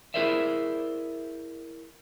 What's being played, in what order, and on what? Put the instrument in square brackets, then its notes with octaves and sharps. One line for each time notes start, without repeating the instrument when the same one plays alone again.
[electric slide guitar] E4 G#4 A#4 C5 D5 E5